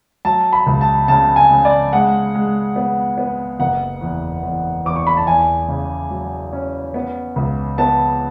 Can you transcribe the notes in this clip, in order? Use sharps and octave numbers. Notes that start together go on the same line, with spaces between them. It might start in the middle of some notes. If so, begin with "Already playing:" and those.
F#3 A5
B5
C#2
A5
C#3 A5
G#5
C#3
D5
G#3 F#5
G#3
B3
B3
F#1 F#5
E2
E2
E2 D6
C#6
B5
A5
E2 G#5
C#3
F#3
C#4
B3
C#2
B3 A5